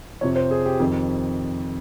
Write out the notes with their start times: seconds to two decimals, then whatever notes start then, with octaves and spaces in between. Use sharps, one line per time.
0.21 F2 C3 F3 C#5
0.36 C5
0.51 G#4
0.66 G4
0.80 F2 D#3